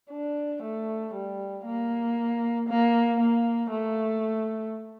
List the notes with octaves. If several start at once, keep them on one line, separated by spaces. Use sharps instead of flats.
D4
A3
G3
A#3
A#3
A#3
A3